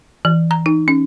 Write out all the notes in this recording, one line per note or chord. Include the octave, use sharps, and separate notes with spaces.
E3
A#5
D#4
C#4